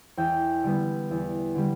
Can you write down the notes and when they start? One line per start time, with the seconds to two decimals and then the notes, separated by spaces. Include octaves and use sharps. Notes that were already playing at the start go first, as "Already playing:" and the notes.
0.17 E2 G5
0.64 D3 G3 B3
1.11 E2
1.55 D3 G3